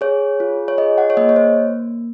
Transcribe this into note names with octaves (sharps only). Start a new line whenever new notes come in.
G#4 C#5
F4
C#5
G#4 D#5
F#5
C#5
A#3 D#5
C#5
C5